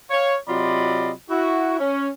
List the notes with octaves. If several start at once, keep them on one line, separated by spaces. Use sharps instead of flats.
C#5 F5
C3 F#3 F4 D5 D#5 B5
E4 F#4
C#4